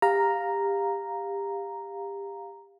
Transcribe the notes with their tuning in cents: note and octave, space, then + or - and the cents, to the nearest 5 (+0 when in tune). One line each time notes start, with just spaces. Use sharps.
G4 +25 F5 +5 A#5 +0